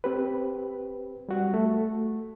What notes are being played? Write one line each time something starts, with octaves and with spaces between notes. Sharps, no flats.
C4 G4 B4
G3 F#4
A3